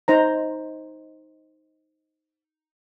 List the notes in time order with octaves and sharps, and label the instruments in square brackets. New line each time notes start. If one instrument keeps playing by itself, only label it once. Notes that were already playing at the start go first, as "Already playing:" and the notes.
[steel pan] D#4 C5 A#5